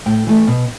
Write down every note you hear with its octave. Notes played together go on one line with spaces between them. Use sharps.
A2 G5
E3 A3
B2